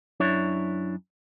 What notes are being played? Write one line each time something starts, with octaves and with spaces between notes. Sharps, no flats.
F#2 D4 E4 C#5